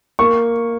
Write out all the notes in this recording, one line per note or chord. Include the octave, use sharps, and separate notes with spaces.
A#3 C#6